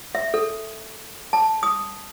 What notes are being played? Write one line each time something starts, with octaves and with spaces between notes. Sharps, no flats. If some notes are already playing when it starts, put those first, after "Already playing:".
E5
A4
A5
D#6